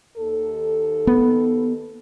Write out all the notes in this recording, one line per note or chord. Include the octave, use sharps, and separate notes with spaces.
D#2 A4
B3